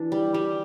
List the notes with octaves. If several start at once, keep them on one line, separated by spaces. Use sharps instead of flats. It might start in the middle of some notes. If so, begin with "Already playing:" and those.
Already playing: E3 D4
G3
G3